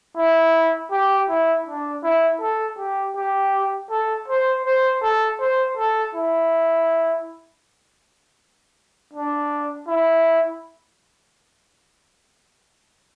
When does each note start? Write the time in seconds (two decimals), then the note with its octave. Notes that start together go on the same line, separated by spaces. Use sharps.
0.17 E4
0.92 G4
1.29 E4
1.66 D4
2.04 E4
2.41 A4
2.78 G4
3.16 G4
3.90 A4
4.28 C5
4.65 C5
5.03 A4
5.40 C5
5.77 A4
6.15 E4
9.13 D4
9.88 E4